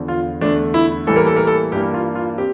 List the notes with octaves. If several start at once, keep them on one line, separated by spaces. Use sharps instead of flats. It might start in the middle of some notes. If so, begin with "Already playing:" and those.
Already playing: E2 D3 F3
F4
E2 D3 A3 D4
E4
A2 E3 G3 A#3 A4
A#4
A4
A#4
A4
G2 E3 A#3 G4
F4
F4
C4 G4